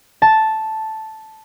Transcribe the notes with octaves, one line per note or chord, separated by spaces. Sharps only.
A5